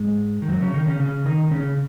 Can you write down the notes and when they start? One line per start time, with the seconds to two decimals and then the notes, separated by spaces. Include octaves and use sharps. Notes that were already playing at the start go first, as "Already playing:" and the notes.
Already playing: G#2 G#3
0.42 D#3
0.48 F#2 F#3
0.61 C#3 C#4
0.74 D#3 D#4
0.87 C#3 C#4
1.00 C#3 C#4
1.26 D#3 D#4
1.51 C#3 C#4